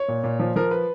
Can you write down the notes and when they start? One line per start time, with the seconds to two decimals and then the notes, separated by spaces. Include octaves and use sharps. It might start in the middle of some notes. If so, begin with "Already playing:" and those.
Already playing: C#5
0.08 A#2
0.24 A#2
0.39 F3
0.56 F3 A#4
0.71 B4